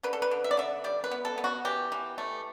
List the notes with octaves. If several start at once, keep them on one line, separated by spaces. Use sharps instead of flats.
D3 B4
A4
B4
D3
E5
D5
D3 E5
G3 D5
B4
B3
A4
B3
F#4
E3 G4
E3
A3